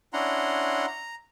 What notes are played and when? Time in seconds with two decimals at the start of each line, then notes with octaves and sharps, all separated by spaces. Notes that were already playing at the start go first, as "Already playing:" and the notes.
0.13 C#4 D4 E4 F#5 A#5 C6
0.87 A#5